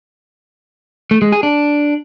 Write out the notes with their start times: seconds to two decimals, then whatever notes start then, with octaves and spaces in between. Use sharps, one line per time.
1.11 A3
1.22 G#3
1.32 G#4
1.43 D4